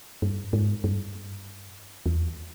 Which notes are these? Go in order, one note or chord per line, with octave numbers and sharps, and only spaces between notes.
G2
G#2
G2
E2